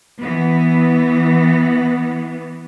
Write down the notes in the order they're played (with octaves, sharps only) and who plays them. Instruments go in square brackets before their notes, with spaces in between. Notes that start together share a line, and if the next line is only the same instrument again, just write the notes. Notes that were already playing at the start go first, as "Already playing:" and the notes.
[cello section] E3 B3